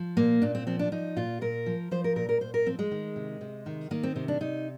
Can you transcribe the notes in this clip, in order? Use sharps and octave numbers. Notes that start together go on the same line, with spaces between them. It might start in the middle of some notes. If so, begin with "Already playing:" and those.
Already playing: F3
A#2 A#3
A#2 D4
C4
F3 C4
D4
F3 D#4
A#2 F4
A#2 A#4
F3
F3 C5
A#4
A#2 A#4
A#4
A#2 C5
A#4
F3 C4
G#3
D#3
C3
C3
D#3
D#3 A#3
C4
C3 C4
D4
C3 D#4